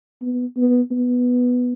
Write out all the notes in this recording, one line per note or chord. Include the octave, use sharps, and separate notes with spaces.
B3
B3
B3